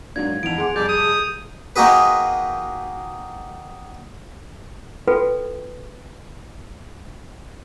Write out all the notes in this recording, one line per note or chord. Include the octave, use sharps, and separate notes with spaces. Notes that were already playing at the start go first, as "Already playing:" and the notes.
G#2 F#3 A#3 D4 G#6
F2 D#3 E3 B3 D7 F7
G#4 F#5 C6 D6
F2 C3 G3 G#4 D5 G6
D#6
D#3 A#3 D#4 F#4 G#4 B4
F4 F#4 A4 B4 G5